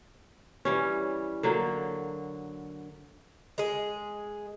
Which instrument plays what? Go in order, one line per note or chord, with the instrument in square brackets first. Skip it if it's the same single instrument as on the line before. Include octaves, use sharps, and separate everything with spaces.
[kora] E3 G3 C#4
D3 F#3 A#3 G5
[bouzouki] G#3 G#4